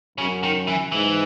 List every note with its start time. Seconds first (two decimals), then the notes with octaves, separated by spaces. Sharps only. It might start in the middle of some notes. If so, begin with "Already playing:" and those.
0.18 F#2 C#3
0.43 D#3
0.67 E3
0.92 G#2 E3